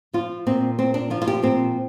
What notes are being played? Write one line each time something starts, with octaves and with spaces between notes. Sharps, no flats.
F3 F4
A#2 C4
A#2 C4
D4
F3 F4
F4
G4
A#2 C4